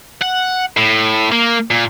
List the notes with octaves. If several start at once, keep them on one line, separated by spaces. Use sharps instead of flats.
F#5
A2
A#3
A#2